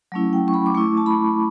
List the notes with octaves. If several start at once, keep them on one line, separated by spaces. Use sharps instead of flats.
F#3 A3 C#4 E4
G5
C#6
B5
D6
A3 E4 C#6
A5
B5